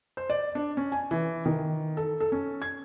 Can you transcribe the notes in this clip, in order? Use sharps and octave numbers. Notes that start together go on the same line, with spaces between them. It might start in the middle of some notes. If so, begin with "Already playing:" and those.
C5
D5
D4
C#4
G#5
E3
D#3
A4
A4
C#4
G#6